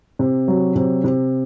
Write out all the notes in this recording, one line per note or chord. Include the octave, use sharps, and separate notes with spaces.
C3
F#3
C3
C3